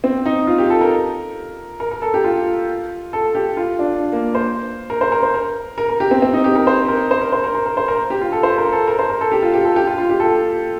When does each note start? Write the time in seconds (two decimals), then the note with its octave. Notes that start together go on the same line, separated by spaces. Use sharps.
0.04 C4
0.25 D#4
0.47 F4
0.58 G4
0.70 A4
0.81 A#4
1.80 A#4
1.91 A#4
2.02 A4
2.14 G4
2.24 F4
3.13 A4
3.35 G4
3.57 F4
3.79 D4
4.12 A#3
4.35 C5
4.90 A#4
5.01 C5
5.12 A#4
5.23 C5
5.34 A#4
5.78 A#4
5.89 A#4
6.00 G4
6.11 C4
6.22 C4
6.33 D#4
6.44 G4
6.56 A#4
6.67 C5
6.88 A#4
7.11 C5
7.21 A#4
7.33 C5
7.44 A#4
7.55 A#4
7.66 A#4
7.77 C5
7.88 A#4
8.10 G4
8.21 F4
8.32 A4
8.43 C5
8.58 A#4
8.72 A4
8.87 A#4
8.99 C5
9.10 A#4
9.21 A4
9.32 G4
9.42 F4
9.54 G4
9.65 A4
9.76 G4
9.87 F4
9.98 F4
10.09 G4
10.20 A4